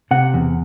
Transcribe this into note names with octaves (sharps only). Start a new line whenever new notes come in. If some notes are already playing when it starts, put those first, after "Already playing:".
C3 F#5
E2